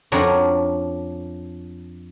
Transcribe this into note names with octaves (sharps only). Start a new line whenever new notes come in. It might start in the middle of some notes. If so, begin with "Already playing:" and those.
F2 D4 F4 C#5 F#5 A#5